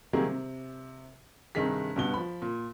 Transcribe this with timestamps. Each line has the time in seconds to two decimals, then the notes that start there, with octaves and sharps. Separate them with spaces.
0.13 C3 D#3 F#3 G3 A#3 G#4
0.26 C3
1.55 G2 C3 D#3 G#4 B6
1.96 G2 B2 G7
2.14 F3 B5
2.42 A#2